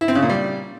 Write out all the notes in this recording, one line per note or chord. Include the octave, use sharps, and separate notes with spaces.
E4
C4
C#3
A#2
G3